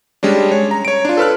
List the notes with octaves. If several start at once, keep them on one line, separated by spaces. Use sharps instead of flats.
G3 G#3 C#4 D4
C#5
A#5
C#5 D7
D4 F4
A4 B4 F6 F#6